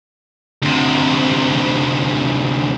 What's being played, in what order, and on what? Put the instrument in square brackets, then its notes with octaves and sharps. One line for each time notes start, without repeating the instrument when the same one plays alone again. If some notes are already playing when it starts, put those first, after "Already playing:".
[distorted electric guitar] D2 C3